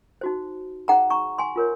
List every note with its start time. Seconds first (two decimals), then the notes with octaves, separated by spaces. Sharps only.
0.21 D#4 F#4 C5
0.88 D#4 G#4 C5 F#5 A#5
1.10 A#5 C#6
1.38 G#5 C6
1.56 F4 A#4 C#5